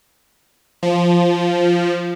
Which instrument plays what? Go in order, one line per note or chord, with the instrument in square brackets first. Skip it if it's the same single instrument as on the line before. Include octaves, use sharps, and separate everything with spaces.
[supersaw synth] F3